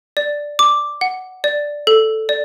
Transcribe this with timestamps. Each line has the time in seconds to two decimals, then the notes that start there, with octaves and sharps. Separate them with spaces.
0.17 D5
0.59 D6
1.01 F#5
1.44 D5
1.87 A4
2.29 D5